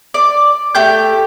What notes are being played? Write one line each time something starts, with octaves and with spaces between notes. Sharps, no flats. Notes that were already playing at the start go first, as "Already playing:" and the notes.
D5
A3 G4 G6